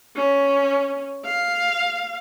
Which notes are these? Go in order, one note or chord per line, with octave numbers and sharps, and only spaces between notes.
C#4
F5